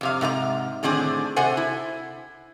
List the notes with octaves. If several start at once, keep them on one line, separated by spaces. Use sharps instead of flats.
F2 C3 F5
G#2 C3 A4 A#5
A2 D3 D#3 C4 D4 G#4
C3 F#4 A4 C5 F#5 G#5
E4